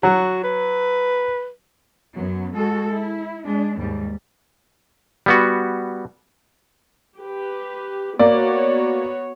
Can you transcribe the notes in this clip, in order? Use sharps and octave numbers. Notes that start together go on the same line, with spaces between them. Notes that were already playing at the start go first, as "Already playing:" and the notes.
F#3 F#4
B4
F#2 F#3 B3
G#3 F#4 A4
E4
G#3 D4
D#2 G#2 G3
G3 B3 F#4
G4 B4
A#3 B3 F#4 C#5 D5